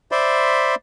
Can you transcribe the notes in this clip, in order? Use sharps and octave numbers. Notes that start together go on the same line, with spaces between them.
C5 D5 E5 B5 C6